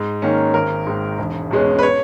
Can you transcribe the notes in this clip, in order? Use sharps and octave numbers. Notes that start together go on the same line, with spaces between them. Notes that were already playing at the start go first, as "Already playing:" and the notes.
Already playing: G#2
D#3 A#3 C#4
G#1 A#4
G#2 D#3
E1
E2 B2 G#3 C#4
B4
C#5